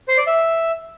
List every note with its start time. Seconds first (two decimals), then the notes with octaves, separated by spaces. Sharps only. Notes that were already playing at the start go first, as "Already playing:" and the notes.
0.08 C5
0.18 D5
0.27 E5